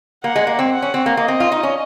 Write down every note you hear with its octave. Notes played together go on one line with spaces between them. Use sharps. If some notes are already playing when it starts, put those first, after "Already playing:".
A#3 F#5
G#3
A#3
C4
F#5
C#4
C4
A#3
A#3 D#5
C4
F4
D#4
C#4